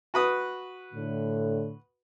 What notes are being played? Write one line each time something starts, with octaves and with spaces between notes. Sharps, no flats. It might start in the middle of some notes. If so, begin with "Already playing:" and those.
F#4 B4 D#6
A2 D3